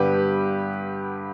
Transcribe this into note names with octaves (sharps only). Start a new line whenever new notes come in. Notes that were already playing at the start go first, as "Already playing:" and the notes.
Already playing: G2 D3 G3 B3 G4 B4